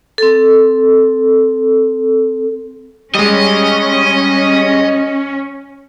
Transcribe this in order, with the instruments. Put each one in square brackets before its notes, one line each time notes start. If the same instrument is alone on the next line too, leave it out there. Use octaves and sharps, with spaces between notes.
[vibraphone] C4 A4
[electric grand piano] G3 G#3 [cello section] C#4 [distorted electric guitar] D#5